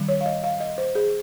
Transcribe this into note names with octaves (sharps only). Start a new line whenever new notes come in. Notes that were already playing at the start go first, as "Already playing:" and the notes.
Already playing: D#3 G3 C#4
C#5
F5
D#5
F5
D#5
C5
G#4